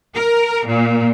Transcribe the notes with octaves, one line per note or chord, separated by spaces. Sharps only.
A#4
A#2